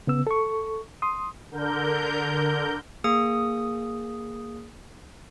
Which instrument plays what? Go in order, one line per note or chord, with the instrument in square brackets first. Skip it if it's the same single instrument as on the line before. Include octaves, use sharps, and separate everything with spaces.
[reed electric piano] C#3 B3 E6
A4 C#6
C6 D#6
[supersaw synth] D3 A#4 G6
[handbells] A#3 G#4 D#6